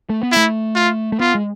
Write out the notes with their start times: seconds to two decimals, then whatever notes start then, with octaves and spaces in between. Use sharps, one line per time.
0.10 A3
0.23 B3
0.32 A3 E4
0.75 F4
1.12 A3
1.20 B3 F4
1.35 G#3